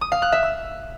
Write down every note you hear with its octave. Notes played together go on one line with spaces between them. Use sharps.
D#6
F5
F#6
E5
E6